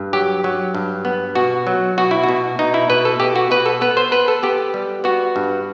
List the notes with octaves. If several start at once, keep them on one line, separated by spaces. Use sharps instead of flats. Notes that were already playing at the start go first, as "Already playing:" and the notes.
Already playing: G2
F#3 G4
F#3
G2
B3
B2 F#4
F#3
B2 F#4
E4
F#4
B2
B2 D#4
E4
B2 B4
A4
B2 G4
F#4
B2 B4
A4
B3 B4
C5
B3 B4
A4
B3 G4
G3
B3 F#4
G2